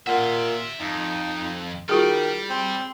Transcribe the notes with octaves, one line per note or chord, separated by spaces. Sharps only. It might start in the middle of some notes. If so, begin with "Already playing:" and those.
A#2 E5 F#5 C6
F2 D#4
D#3 G3 F4 F#4 G#4
C4